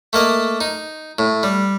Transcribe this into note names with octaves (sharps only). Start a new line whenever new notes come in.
A3 A#3 D#5
D#4
A2
G3